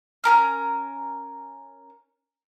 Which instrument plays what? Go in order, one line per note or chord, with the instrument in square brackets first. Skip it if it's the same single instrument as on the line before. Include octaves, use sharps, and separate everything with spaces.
[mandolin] C#4 G4 A#4 F6